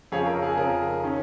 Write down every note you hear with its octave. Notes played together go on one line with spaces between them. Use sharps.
F2 C#3 F3 G#4 C#5
A#4
G#4
F2 C#3 F3 A#4
D#3 C#4